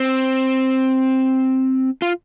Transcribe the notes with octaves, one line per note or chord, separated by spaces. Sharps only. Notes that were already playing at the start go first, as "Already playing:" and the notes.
Already playing: C4
F4